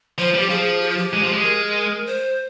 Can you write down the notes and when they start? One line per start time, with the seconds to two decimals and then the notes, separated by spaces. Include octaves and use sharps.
0.18 F3 C5
0.35 G3 G4
0.50 F3 G#4
0.81 G4
0.89 F4
0.97 G4
1.13 G#3
1.23 F3
1.33 G#3
1.44 A#4
2.07 C5